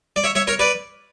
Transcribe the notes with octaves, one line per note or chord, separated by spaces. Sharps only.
D5
C#5 E5
C#5 E5
A#4 C#5
B4 D5